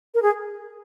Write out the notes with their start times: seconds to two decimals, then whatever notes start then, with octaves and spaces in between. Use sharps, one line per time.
0.14 A#4
0.22 G#4